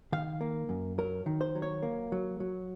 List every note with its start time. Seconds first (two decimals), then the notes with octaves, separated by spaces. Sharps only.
0.12 D#3 F5
0.41 A#3
0.69 F#2
0.98 F#3 A#4
1.26 D#3
1.41 C5
1.55 F#3
1.62 C#5
1.83 A#3
2.12 F#3
2.40 F#3